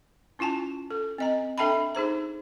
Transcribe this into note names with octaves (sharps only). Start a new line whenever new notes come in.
C#4 E4 F4 G#5 A5
A4
C4 D#5 A#5
D4 A4 E5 G5 A5 B5
D#4 G#4 C5 A#5